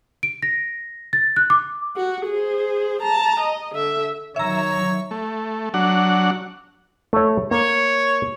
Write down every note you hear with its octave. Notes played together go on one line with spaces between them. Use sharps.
D7
A#6
A6
F#6
D6
F#4
G#4 C5
A5 A#5
D#5
D3 E5
D#3 F#3 C#5 E5 A#5
A3
F#3 D4 F#5
A3 C#5
A#3 C#5